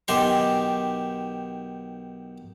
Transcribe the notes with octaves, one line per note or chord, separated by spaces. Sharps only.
B1 D#3 G4 D#5 G#5 C6